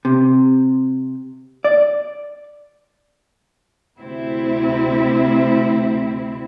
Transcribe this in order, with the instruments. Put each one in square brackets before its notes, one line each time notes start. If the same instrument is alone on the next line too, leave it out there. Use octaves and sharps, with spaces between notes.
[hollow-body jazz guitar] C3
D5
[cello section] D2 C3 C4 E4